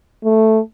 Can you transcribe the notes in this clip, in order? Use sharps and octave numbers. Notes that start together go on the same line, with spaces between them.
A3